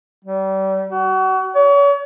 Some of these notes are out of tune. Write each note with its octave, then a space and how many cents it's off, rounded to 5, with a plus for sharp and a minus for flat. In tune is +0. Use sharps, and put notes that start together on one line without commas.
G3 -35
F#4 +30
C#5 +40